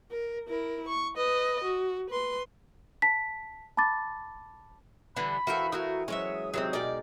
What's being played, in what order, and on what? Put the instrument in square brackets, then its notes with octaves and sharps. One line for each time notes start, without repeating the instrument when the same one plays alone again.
[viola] A#4
E4 A#4
C#6
B4 D#5
F#4
B4 C6
[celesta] A5 B6
A5 B5 D6 A6
[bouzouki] D3 E3 G3 [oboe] B5
[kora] E3 A4 [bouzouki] F#4 E5 [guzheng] A#4 F5 G5
[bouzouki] A3 F#4 A#4 [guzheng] E4 [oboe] D#6
[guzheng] F#3 G#3 [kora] C#4 [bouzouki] C#5 E5
[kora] G#2 C3 E5 [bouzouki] F#3 B3 C4
[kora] B2 D#4 [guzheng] G#4 A#4 G5 [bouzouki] D5